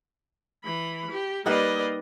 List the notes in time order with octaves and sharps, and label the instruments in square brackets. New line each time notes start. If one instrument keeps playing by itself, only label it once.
[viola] E3 B5
G4
[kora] G3 D#4 F#5 [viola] A#3 D#5 [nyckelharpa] B4 D5